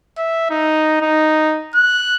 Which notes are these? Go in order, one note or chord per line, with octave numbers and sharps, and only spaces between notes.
E5
D#4
D#4
F#6